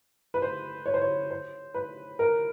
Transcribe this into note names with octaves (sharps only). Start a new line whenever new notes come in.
B4
C5
C#5
C5
C#5
C5
B4
A#4